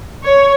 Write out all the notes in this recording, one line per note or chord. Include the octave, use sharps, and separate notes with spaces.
C#5